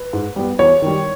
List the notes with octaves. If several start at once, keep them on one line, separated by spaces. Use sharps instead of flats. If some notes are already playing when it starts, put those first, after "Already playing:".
Already playing: B4
G#2
G3 B3
E2 C#5
D#3 G3